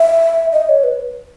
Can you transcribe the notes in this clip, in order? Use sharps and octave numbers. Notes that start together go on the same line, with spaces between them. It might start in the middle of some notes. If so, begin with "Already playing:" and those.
Already playing: E5
D#5
C#5
B4